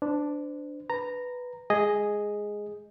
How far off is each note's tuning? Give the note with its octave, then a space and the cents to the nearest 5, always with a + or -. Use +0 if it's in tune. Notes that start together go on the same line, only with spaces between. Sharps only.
D4 +0 C5 -35
B4 +0 A#5 -10
G#3 +0 G#4 +0 D#5 +0